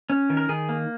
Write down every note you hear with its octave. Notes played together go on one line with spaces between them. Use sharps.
C#4
D#3
A#4
D#3 G#4
A#3